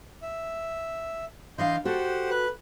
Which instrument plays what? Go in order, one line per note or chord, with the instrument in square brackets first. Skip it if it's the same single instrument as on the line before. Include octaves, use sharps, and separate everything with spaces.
[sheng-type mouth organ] E5
[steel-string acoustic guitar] E3 D4 F5 [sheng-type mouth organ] D#5 C6 G6
[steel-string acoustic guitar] F#4 A4 [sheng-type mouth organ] G4 C5 F#5
[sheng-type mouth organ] B4 F#6